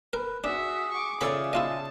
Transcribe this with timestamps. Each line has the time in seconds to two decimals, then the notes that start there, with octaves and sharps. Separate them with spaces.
0.13 A#4 B4
0.44 D4 F#4 G#4 E5
0.92 C#6 D6
1.21 C#3 F4 A4 D5 E5 B5
1.53 E4 F4 D#5 A5